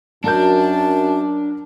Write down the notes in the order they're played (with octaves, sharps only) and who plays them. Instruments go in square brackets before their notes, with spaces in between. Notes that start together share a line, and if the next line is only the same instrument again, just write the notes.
[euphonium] F#2 [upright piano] F#3 A#4 G6 [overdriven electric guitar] D4 [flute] A5